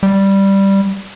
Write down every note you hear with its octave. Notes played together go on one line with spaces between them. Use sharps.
G3